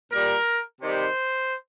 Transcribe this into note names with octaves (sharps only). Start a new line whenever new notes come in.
A#2 G3 A#4
C3 D#3 G3 C5